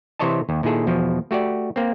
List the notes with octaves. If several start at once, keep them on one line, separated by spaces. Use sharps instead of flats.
C3 E3 C5 C#5 D#5 A5
D#2
A#2 D#3 E4 G#4 A4
E2 B2 F3
A3 F#4 G4 D5
A#3 C4